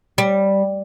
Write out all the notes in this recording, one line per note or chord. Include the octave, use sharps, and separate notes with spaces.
G3